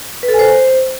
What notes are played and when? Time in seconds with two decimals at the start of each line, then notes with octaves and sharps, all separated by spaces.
0.23 B4
0.28 A4
0.34 G#5
0.39 C5